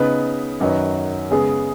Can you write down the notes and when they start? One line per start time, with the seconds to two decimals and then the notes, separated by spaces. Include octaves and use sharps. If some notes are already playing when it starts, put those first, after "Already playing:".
Already playing: C#3 B3 D#4 B4
0.60 F#2 D#3 F#3 D#4 B4
1.30 C#3 G#3 B3 G#4